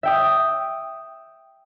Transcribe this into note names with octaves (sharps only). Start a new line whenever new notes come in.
E5 G5 D#6